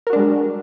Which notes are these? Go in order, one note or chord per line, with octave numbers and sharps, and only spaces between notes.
G3 G#3 D4 F#4 A#4